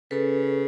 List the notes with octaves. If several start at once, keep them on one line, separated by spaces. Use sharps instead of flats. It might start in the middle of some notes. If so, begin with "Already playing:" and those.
C#3 A4 B4